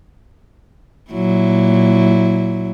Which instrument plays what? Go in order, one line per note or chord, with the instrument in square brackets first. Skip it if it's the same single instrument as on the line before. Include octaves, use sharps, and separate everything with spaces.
[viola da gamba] A#2 F#3 E4